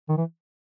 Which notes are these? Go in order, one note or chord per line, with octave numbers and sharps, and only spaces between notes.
D#3
E3